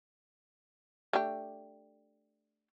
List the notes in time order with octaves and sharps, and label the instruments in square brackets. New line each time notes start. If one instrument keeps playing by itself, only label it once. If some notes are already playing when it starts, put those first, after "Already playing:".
[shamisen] A3 D4 G4